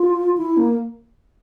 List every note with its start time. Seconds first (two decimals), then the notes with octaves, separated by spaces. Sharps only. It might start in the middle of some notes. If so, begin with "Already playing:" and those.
Already playing: F4
0.37 E4
0.57 A#3